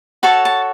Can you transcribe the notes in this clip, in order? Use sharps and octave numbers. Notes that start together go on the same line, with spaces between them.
F#4 A4 C#5 A5
A5